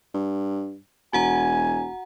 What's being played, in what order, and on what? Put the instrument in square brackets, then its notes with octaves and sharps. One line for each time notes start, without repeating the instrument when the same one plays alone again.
[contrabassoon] G2
[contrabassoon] E1 [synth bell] F#4 F#5 A#5 [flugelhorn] G#5